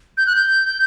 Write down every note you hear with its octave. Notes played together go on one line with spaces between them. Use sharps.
G6
F#6
G6